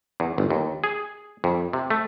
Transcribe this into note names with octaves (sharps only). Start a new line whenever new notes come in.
E2
G1
D#2
G#4
F2
C3
A3